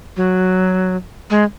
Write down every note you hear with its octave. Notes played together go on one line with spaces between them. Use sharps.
F#3
G#3